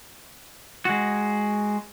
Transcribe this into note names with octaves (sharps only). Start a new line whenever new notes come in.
G#3 F#4